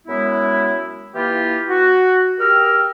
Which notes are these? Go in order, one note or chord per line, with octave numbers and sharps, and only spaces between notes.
F#2 G#3 B3 E4
E3 A#3 E4 F4 G4
F#4
G4 A#4 G5 E6 F6